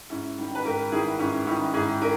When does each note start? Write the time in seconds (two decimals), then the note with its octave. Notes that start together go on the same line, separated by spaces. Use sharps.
0.10 G#2 C#4 E4
0.38 D#3 G3
0.55 B4
0.65 G#2 G4 A#4
0.92 D#3 G3 E4 G#4
1.19 G#2 C#4 E4
1.47 D#3 G3 C#4 E4
1.74 G#2 E4 G#4
2.01 D#3 G4 A#4